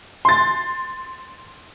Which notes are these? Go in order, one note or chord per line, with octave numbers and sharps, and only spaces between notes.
C6 A6